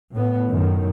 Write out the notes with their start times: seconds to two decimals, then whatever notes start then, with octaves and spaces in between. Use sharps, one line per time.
0.13 A2 B3
0.47 F#2 A2 D#3